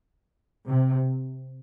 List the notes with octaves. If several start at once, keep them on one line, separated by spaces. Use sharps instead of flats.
C3